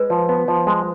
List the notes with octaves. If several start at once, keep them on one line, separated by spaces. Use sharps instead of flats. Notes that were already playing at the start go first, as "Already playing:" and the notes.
Already playing: G#3 B4
F3
B3
F3
G#3